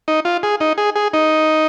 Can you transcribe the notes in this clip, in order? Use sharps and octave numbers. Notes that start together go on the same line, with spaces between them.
D#4
F4
G#4
D#4
G#4
G#4
D#4